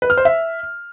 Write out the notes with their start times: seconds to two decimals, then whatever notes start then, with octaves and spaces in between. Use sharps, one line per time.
0.02 B4
0.10 F6
0.17 C5
0.25 E5